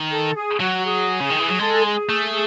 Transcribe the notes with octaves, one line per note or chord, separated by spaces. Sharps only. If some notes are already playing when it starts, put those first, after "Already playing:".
Already playing: D#3
A4
G#4
F#3 F#4
G#4
C#3
D#3
E3
F#3
G#3 A4
G#4
A3